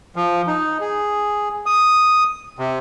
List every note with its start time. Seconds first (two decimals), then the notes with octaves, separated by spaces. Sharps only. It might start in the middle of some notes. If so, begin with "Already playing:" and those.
0.16 F3
0.47 D#4
0.80 G#4
1.66 D#6
2.59 C3